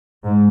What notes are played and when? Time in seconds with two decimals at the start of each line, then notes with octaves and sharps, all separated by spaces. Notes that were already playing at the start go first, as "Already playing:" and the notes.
0.24 G#2